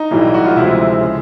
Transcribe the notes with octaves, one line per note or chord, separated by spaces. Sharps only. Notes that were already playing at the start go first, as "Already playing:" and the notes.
Already playing: D#4
B1 A2 E3 G3
F#4
F4
D2 C3 F3 G#3 E4
C#3